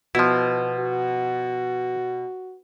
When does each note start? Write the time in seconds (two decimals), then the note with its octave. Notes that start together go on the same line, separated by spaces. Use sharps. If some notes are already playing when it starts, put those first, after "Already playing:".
0.15 B2 F3 E4
0.80 F#4